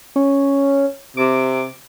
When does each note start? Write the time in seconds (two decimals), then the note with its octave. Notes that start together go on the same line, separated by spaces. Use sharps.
0.16 C#4
1.17 C3 D6